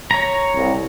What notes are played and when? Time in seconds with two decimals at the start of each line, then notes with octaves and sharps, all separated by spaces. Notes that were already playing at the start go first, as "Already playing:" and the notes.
0.11 C#5 A#5
0.56 C2